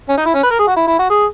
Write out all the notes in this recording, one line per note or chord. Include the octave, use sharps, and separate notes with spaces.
C#4
D#4
E4
C#4
B4
A#4
G#4
F#4
E4
E4
F#4
G#4